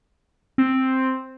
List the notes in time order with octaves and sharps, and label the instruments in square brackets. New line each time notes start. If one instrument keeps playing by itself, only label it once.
[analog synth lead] C4